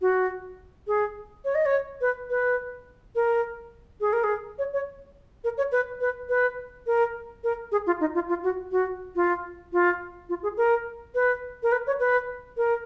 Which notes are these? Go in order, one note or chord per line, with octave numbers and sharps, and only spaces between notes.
F#4
G#4
C#5
D#5
C#5
B4
B4
A#4
G#4
A#4
G#4
C#5
C#5
A#4
C#5
B4
B4
B4
A#4
A#4
G#4
F4
D#4
F4
F4
F#4
F#4
F4
F4
F4
G#4
A#4
B4
A#4
B4
C#5
B4
A#4